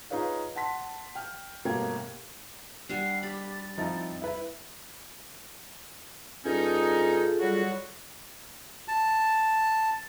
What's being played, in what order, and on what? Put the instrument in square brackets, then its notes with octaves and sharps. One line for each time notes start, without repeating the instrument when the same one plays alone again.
[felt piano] D#4 F4 G#4 B4 C#5 F5
F#5 A5 C6 B6
G5 F6
G1 B2 A3 A#3 G4 G#6
[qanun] G3 D4 [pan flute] F#5 [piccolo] C7
[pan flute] G4 [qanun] B5 [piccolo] A6
[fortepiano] F3 D#4 E4 [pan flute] C4
[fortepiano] E4 B4
[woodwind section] G2 C#4 D#4 [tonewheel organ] F4 G#4 A4
[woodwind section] F#3 G3 F#4
[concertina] A5